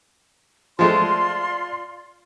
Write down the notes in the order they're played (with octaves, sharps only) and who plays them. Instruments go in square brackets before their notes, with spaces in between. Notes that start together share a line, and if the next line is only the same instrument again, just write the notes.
[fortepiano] F3 G#3 A3 [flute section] F4 D5 C6